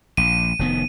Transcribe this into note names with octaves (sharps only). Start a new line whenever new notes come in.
A#1 D#7
F1 D#3 B3